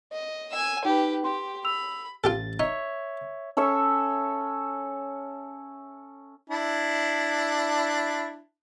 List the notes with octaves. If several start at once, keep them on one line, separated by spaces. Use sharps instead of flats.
D#5
G#5 E6
D#4 G4 B4
G4 C6
B5 E6 F7
A1 F4 G4 A4 A6
D#4 C#5 E5
C#4 A4 C#5 E5
D4 E4